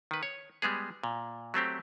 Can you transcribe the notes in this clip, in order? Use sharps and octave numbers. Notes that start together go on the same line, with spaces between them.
D#3 B4
C#5
G3 G#3 B3 G#4
A#2
F#3 A3 C4 G4